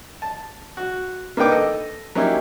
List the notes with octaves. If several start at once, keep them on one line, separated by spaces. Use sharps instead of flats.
A5
F#4
A#3 D4 D#4 B4 G5 D6
A4 D#5
F#3 A#3 C#4 D#4 E4 G4